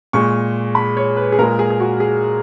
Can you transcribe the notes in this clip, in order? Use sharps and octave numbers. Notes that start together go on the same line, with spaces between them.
A#2 G#3 C#6
B5
C#5
B4
G#4
A#2 G#3 A#4
G#4
G#4
F#4
G#4